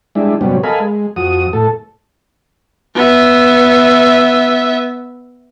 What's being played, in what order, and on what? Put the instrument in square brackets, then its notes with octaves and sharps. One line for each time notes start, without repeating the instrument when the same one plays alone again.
[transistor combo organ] G3 G#3 D4 E4
G2 C3 F#3 G3 B3 C#4
A4 A#4 D#5 F5 G#5 B5
G#3
F2 F#4 D#6
A2 A4
[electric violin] B3 E5